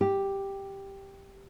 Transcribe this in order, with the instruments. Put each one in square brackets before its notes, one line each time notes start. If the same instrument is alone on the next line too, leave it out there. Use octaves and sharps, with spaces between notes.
[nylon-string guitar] G4